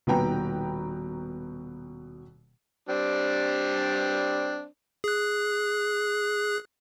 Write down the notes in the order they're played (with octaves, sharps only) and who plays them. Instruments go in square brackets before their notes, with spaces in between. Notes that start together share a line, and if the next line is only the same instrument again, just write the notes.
[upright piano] D#1 B2 B4 G5 A#5
[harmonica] G3 C4 D4
[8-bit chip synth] G#4 F#6